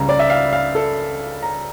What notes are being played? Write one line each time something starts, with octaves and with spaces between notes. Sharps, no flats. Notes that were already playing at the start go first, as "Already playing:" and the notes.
Already playing: C#2 C#3 G3 A#5
D5
E5
F5
F5
A4
A#5